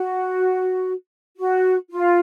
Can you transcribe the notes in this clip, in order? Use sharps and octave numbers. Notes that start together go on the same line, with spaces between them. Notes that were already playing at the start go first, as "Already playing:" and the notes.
Already playing: F#4
F#4
F4